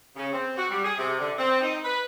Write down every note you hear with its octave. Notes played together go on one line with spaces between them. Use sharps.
C#3
C4
F#4
G3
G#4
C3
D3
C4
D#4
B4